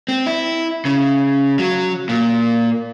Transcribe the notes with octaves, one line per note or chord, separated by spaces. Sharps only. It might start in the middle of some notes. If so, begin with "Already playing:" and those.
C4
E4
C#3
F#3
A#2